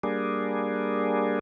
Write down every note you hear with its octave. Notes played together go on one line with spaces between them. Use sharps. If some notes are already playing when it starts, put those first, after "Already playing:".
G3 A#3 D4 G#4